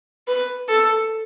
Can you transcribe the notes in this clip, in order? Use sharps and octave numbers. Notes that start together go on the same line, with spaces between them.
B4
A4